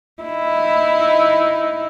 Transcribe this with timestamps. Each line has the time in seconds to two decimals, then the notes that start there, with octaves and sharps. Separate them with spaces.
0.23 D#4 E4